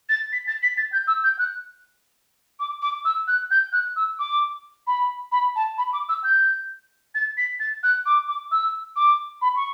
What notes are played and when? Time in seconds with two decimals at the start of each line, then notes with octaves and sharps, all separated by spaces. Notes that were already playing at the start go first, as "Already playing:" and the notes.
0.09 A6
0.32 B6
0.47 A6
0.63 B6
0.77 A6
0.92 G6
1.07 E6
1.24 G6
1.39 F#6
2.59 D6
2.82 D6
3.05 E6
3.28 F#6
3.51 G6
3.73 F#6
3.96 E6
4.19 D6
4.87 B5
5.32 B5
5.56 A5
5.78 B5
5.93 D6
6.09 E6
6.24 G6
7.15 A6
7.37 B6
7.60 A6
7.83 F#6
8.06 D6
8.28 D6
8.52 E6
8.96 D6
9.42 B5
9.56 C#6